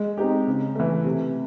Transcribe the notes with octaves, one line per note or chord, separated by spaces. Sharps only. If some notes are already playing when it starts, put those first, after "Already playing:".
Already playing: G#3
C4 D#4 G4
C#3
E3 A3
C3